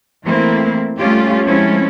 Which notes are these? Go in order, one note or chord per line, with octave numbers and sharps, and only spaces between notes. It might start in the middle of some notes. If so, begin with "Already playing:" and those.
E3 A3 A#3 C4 E4
G3 A3 C#4 F4 G4
F3 G#3 A3 C4 C#4 E4